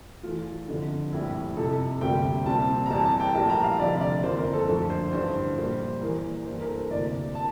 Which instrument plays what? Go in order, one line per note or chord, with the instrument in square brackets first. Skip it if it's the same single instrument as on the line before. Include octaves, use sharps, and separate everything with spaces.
[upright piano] E2 E3 A3 F4
G1 F2 D3
A#1 A2 G3 C4 E4
F2 C3 F3 A4
D2 C3 G3 A#3 G5
C2 A#2 G3 C4 A5
A#5
E2 E3 G3 C4 A5
A5
G5
A#1 A2 G3 A5
A#5
F5
F1 F2 D3 D5
D5
G1 F2 E3 A#3 C5
A#4
A4
D2 D3 F3 A#3 A4
C5
A1 G2 D3 C5
A#1 A#2 G3 A#3 C5
E2 E3 A#3 A#4
G2 E3 A#3 C5
A#4
A4
A#4
D2 C3 E3 A#3 D5
A5